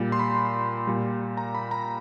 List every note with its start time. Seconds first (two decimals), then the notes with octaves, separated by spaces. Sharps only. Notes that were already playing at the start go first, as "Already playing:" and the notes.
Already playing: A#2 G3
0.12 C6
0.19 B5
0.87 A#2 G3
1.37 A#5
1.55 B5
1.71 A#5